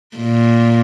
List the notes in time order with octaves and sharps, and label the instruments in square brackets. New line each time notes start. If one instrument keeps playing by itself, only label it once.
[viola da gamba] A#2